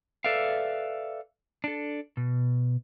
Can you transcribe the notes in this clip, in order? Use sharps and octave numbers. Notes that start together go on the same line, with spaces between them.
A4 B4 D5 E5 F5
D4 A4
B2